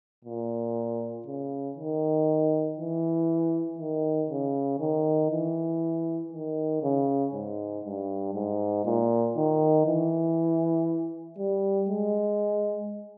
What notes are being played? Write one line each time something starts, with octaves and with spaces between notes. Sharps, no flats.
A#2
C#3
D#3
E3
D#3
C#3
D#3
E3
D#3
C#3
G#2
G2
G#2
A#2
D#3
E3
G3
G#3